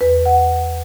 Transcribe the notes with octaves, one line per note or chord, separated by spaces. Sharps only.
E2 B4
F#5